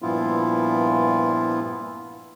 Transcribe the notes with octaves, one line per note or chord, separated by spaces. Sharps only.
G2 A#2 F3 B3 E4 F4